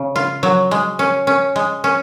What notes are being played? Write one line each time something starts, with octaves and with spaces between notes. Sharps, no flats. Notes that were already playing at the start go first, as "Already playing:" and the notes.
Already playing: C#3
F4
F#3
G#3
C#4
C#4
G#3
C#4